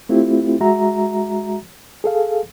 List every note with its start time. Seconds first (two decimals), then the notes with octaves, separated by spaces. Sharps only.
0.09 A3 C4 E4 F4 G4
0.60 G#3 F#4 E5 A#5
2.04 G#4 A4 F5